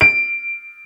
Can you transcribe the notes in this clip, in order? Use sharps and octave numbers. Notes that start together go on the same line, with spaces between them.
D7